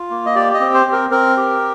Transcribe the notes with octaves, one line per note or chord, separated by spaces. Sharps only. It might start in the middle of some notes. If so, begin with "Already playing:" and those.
Already playing: F4
A#3
D#5
G4 D5
D#5
C4
C5
C4
A#4
C4 A#4
G4